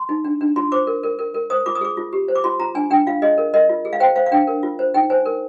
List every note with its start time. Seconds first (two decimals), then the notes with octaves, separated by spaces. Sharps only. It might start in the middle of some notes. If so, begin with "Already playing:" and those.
Already playing: C6
0.09 D#4
0.24 D4
0.41 D4
0.56 F4 C6
0.72 C5 D6
0.87 A#4
1.03 A#4
1.19 A#4
1.34 A#4
1.50 C5 D#6
1.66 F4 D6
1.75 D#6
1.81 G#4 D6
1.97 F4
2.13 G4
2.28 C5
2.36 D6
2.44 F4 C6
2.60 F4 A#5
2.75 D4 G#5
2.90 D4 G5
3.06 F4 F5
3.22 G#4 D#5
3.38 A#4
3.54 A#4 D#5
3.69 F4
3.85 G#4
3.93 F5
4.00 C5 G5
4.15 C5 F5
4.26 F5
4.32 D4 G5
4.47 A#4
4.63 F4
4.79 C5
4.94 D#4 G5
5.10 C5 G#5
5.25 A#4